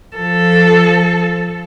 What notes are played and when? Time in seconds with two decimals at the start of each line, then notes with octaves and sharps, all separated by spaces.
0.16 F3 A4